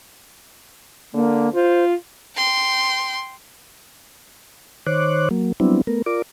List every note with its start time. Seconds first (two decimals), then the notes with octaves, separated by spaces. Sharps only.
1.14 D3 A#3
1.54 F4 C5
2.36 G5 C6
4.86 D#3 C5 C#5 D6 F#6
5.31 F#3 A#3
5.60 F#3 G3 B3 C4 D4 E4
5.87 A3 B3 A#4
6.06 F4 A#4 D5 D6